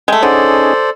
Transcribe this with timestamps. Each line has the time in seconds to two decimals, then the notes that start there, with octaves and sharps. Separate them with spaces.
0.08 G#3 A3 G5
0.23 D3 C#4 D#4 G#4 A4 C5 D5